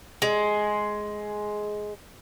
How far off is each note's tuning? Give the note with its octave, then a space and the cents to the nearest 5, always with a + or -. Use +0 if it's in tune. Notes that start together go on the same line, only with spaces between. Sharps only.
G#3 +10